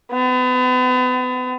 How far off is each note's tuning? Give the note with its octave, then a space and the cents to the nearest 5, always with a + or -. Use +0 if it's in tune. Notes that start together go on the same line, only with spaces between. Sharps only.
B3 +35